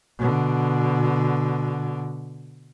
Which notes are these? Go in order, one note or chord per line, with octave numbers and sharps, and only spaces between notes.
B2 D3